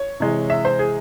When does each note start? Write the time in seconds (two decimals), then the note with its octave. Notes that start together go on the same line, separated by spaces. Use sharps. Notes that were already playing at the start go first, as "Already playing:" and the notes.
Already playing: C#5
0.20 C3 E3 G#3
0.50 E5
0.65 C5
0.79 G#4